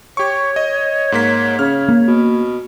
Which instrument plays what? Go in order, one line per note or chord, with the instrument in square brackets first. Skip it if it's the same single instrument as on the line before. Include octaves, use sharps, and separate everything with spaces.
[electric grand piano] G4 C#6 [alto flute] C#5
[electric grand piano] D#5
G#2 A#3 B6
[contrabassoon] C#3 [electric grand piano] F6
[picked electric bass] A#3
[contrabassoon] B2